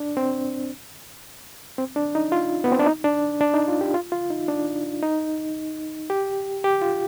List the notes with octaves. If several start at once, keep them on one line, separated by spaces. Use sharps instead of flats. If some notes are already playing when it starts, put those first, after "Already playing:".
Already playing: D4
C4
C4
D4
D#4
F4
B3
C4
D4
D#4
D4
D4
D#4
F4
G4
F4
F4
D#4
D4
D#4
G4
G4
F4